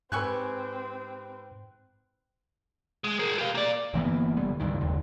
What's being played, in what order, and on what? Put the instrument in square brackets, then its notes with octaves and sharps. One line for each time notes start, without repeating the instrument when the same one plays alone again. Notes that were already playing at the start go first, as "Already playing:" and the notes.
[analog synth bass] G#2 [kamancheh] C4 [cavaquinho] G4 G#5 C#6 [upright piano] B4 E6 F#6
[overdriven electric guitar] G#3
G#4 A#4
G4 F5
A#3 D5
[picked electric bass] G1 E3 A#3 B3
F1 D3 G3 B3
C#2 G2 D#3
F#1 D#2 D3